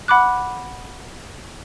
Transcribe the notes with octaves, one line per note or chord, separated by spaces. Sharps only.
F#5 B5 D6 F#6